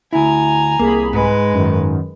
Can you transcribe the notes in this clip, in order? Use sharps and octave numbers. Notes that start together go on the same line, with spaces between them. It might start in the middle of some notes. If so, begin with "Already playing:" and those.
D2 E4 G#5 A#5
C2 A#3 G#4 B5
G#2 G#3 B4
F#2 D#3